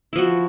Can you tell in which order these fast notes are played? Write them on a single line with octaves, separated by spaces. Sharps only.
E4 F3 F#4